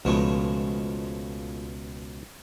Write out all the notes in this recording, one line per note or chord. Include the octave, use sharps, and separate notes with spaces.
C#2 B2 F3 G#3 A3